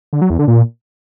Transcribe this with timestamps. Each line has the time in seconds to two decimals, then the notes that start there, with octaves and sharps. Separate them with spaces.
0.13 D3
0.21 F#3
0.30 E2
0.39 D3
0.48 A#2